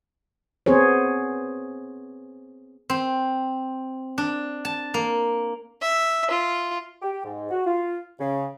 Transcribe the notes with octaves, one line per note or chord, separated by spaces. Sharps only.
B3 C4 G#4 C5 C#5
C4
D4
A5
A#3
E5
F4
G4
G#2
F#4
F4
C#3